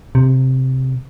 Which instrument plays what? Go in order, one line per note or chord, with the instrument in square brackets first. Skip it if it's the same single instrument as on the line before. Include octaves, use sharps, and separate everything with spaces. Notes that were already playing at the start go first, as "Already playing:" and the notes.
[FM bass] C3